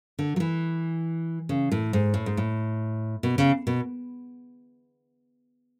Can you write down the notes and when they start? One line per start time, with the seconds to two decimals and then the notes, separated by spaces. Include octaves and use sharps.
0.19 D3
0.36 F#3
0.40 E3
1.49 C#3
1.72 A2
1.93 G#2
2.14 A2
2.26 G#2
2.37 A2
3.23 B2
3.38 C#3
3.67 B2